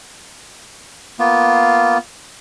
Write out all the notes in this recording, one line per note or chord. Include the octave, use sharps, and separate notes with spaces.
A#3 B3 F4